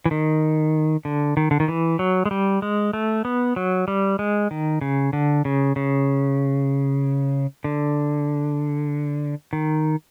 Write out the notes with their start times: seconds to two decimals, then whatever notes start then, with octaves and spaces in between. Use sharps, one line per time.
0.06 E3
0.11 D#3
1.05 D3
1.37 D#3
1.51 D3
1.60 D#3
1.68 E3
1.99 F#3
2.26 G#3
2.31 G3
2.62 G#3
2.93 A3
3.25 B3
3.56 F#3
3.88 G3
4.19 G#3
4.51 D#3
4.81 C#3
5.13 D3
5.45 C#3
5.76 C#3
7.64 D3
9.53 D#3